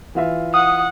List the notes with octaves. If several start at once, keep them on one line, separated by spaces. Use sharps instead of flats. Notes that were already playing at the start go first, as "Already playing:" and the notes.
E3 F4 E5
F#5 D#6